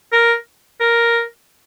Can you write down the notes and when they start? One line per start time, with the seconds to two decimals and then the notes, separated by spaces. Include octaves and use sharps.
0.13 A#4
0.81 A#4